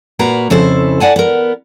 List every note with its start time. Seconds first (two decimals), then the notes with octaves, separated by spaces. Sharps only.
0.19 A#2 A#3 F#4 B4 A#5
0.50 F2 C#3 E4 A4 C5
1.00 D5 F#5 G#5 A5
1.16 B3 A#4